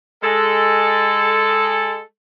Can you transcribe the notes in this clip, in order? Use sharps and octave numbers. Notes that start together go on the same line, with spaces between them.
G#3 A4